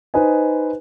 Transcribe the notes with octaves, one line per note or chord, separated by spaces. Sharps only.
D#4 B4 C5 D#5 G#5